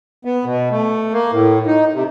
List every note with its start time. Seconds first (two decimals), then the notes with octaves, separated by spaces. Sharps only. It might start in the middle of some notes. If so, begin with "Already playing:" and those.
0.25 B3
0.45 B2
0.71 A3
1.13 A#3
1.32 A2
1.66 D#4
1.93 C3